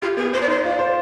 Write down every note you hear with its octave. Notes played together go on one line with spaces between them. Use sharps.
F4 G4
B3 G#4
B3 C5
D5
D#4 C5
F4 D5
C5